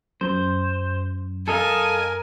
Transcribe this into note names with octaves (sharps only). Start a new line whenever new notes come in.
F#2 C5
A4 A#4 D#5 F5 G#5